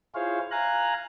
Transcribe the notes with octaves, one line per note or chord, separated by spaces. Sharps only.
E4 F4 G#4 C5 C#5 F5
F5 G#5 A#5 F#6